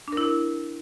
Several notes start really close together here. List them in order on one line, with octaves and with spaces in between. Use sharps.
D4 A#4 E4